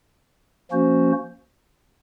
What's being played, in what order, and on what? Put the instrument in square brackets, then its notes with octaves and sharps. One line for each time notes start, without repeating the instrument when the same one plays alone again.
[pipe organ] F3 A#3 C#4 F#4 C5